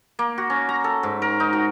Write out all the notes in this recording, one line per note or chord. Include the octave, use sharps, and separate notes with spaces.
A#3
F#4
C#4
A#5
A4
G#2
A#4
D#4
F#4